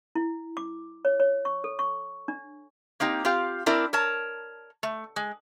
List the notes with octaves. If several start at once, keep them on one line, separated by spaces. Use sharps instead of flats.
E4
D6
C#5
C#5
C#6
A4
C#6
D4
A#3 C4 D#4 G4
C4 F4 G4 F5
C4 D4 E4 A#4 D5
A#4 C#5 A5
A3
G#3